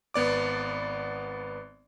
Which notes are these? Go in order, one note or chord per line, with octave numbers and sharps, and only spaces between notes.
G#1 B3 D5 D6